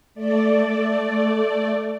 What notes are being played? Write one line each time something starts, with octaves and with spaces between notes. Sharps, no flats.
A3 D5